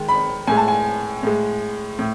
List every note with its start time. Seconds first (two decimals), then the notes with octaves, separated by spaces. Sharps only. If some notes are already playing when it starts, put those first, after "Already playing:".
Already playing: D#3 G#3
0.09 B5
0.47 A2 G#3 G#5
0.57 A5
0.68 G#5
1.23 A2 G#3
1.99 A2